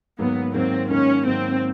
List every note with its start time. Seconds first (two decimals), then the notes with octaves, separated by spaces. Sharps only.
0.19 G#2 D#3 F#3 A#3 B3
0.54 G#2 D#3 F#3 A#3 C4
0.90 G#2 D#3 F#3 A#3 C#4
1.25 G#2 D#3 F#3 A#3 C4